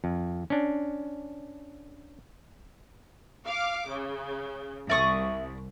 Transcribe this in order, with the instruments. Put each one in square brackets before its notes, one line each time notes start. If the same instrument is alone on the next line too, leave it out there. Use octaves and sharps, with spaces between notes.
[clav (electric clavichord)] F2
C#4 D4
[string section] F5 D6
C#3
[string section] C2 [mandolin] D5 C#6 D#6 [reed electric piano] E5